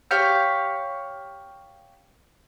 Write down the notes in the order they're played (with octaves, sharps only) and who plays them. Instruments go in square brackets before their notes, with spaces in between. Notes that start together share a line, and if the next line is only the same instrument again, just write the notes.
[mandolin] G4 C#5 F5 G6